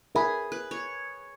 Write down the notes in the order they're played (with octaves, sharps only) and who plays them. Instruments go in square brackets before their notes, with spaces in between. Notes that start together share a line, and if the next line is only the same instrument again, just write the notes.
[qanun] G#4 [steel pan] A#4 E5 G#5 B5
[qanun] B4
C#5